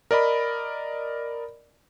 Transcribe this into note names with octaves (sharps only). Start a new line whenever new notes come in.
A#4 D5 D#5 B5